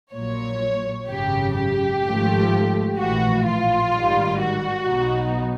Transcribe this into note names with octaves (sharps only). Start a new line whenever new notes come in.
A#1 A#2 F#3 C#5
G#1 F#2 C#3 G4
G4
G#1 G#2 F3 A3
A#1 A2 E3 F#4
F4
A1 G#2 D#3 G3
F#4
B1 B2 F#3 B3 D#4